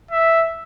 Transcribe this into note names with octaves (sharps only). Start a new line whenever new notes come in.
E5